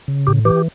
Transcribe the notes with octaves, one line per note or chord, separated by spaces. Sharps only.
C#3
A2 G4
E3 G4